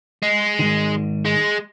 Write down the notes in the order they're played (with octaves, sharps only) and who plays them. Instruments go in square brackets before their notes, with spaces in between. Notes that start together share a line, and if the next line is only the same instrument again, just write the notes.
[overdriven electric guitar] G#3
[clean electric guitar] G#2 D#3
[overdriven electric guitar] G#3